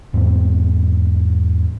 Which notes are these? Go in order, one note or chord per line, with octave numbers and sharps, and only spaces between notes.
E2 G#2 B3 C4